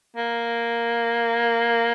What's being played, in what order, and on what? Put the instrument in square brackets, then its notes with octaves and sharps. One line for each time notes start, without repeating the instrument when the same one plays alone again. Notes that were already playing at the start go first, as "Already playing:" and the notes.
[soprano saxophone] A#3